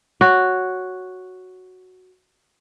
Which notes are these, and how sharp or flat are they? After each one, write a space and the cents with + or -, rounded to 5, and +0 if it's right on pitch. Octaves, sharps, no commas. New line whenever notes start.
F#4 +0 C#5 +0